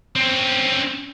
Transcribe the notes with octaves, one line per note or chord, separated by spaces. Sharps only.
C4 C#4